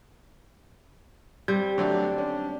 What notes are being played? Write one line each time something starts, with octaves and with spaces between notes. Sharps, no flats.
G3 C4 G6
D3 F#3 A3 D4
C#4